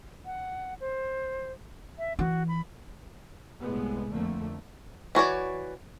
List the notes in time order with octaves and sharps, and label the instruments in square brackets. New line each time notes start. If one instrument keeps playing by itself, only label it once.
[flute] F#5
C5
E5
[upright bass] E3 [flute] F#4
[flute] B5
[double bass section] C2 A2 G#3 B3
F2 D3 A3 A#3
[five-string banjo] E3 F#4 C#5 D5